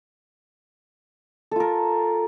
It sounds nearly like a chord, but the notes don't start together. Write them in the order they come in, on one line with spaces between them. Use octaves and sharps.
A4 F4 A#4